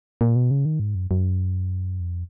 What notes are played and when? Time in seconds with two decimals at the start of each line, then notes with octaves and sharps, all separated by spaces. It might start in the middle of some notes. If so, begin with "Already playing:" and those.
0.21 A#2
0.36 B2
0.51 C#3
0.65 D#3
0.80 G#2
0.95 F#2
1.11 F#2
2.00 F2